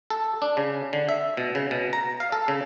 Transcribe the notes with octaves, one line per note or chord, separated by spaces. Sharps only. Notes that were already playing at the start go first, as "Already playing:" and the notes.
A4
D4
C#3
D3
E5
B2
C#3
B2
A#5
F5
A4
C#3